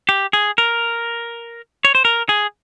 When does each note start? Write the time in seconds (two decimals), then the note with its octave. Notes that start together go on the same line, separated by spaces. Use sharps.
0.09 G4
0.33 G#4
0.58 A#4
1.85 C#5
1.95 C5
2.05 A#4
2.29 G#4